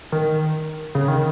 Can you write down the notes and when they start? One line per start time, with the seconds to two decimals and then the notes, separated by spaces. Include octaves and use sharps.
0.12 D#3
0.95 C#3
1.08 D#3